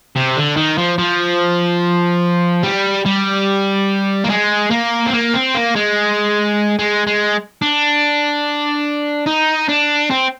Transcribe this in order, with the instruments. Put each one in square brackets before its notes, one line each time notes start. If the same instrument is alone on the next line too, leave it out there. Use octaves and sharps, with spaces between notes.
[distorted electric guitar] C3
D3
D#3
F3
F3
G3
G3
A#3
G#3
A#3
C4
A#3
C4
A#3
G#3
G#3
G#3
D4
D#4
D4
C4